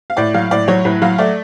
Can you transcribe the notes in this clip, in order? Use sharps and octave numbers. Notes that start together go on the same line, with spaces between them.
F5
A2 D5
F#3 F5
A2 D5
F#3 C#5
A2 B4
F#3 F5
A3 D5